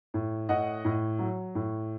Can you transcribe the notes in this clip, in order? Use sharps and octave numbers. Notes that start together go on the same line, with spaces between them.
A2
A2 D#5 F#5
A2
F#3
A2